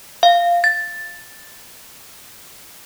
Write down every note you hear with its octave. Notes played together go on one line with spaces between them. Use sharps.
F5
A6